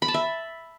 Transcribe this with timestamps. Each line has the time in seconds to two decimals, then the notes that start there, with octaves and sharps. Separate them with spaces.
0.02 B5
0.08 A5
0.14 E5